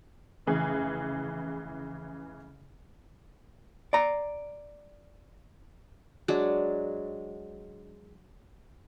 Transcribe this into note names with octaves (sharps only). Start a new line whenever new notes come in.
F1 C#3 E3 G#4
D5 A#5
F#3 G#3 D4